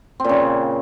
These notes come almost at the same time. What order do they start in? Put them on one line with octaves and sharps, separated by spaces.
C4 A#2 C#3